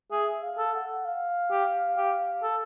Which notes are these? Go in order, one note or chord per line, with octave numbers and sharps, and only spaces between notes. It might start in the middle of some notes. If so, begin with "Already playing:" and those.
G#4 E5
F5
A4
F#5
F5
G4
G4
A4